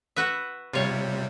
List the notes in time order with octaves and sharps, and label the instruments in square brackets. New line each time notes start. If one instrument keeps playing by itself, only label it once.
[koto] F#4 B4 E5
[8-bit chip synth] C3 G3 [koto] F4 C#5